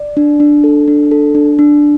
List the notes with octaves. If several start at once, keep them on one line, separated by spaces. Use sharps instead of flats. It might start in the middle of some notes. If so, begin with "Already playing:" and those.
Already playing: D5
D4
D4
A4
D4
A4
D4
D4